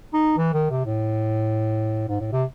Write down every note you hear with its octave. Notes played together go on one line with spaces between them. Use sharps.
D#4
E3
D#3
C3
A2
G#2
A2
C3